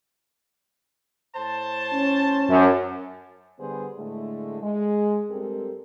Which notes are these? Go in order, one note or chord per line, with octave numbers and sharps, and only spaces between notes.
A2 C5 A5
C#4
F#2
D3 G3 B3 G#4 B4 C5
A2 D3 G#3 A3
G#3
G2 G#3 C4 G4 A4 A#4